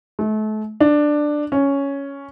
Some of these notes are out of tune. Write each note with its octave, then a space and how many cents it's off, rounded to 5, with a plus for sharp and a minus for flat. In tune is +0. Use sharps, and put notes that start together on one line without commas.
A3 -35
D4 +10
C#4 +5